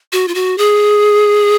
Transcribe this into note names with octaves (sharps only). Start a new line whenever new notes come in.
F#4
F4
F#4
G#4